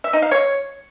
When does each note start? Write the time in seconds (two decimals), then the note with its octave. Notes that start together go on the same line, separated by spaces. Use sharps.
0.04 E5
0.13 D#4
0.22 F5
0.31 C#5